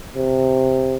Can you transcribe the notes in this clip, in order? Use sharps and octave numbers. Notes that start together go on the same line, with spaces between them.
C3